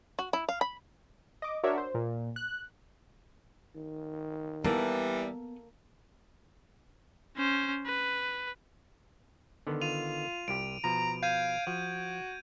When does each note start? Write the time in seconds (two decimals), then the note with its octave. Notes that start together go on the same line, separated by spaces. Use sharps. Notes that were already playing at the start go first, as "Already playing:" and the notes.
0.19 F#4
0.33 E4
0.49 F5
0.61 B5
1.42 D#5 D6
1.63 D4 F#4 A#4 C#5 D5 E5
1.78 C5
1.94 A#2
2.36 F#6
3.75 D#3
4.64 E3 G3 A#3 B3 A4 A#4
7.36 C#4 C5
7.86 B4
9.67 D3 D#3 B3
9.82 F4 D#7 F7
10.48 C2 G4 D7
10.84 B2 F3 A#5
11.23 F5 G6 G#6 D#7
11.67 F3 F#4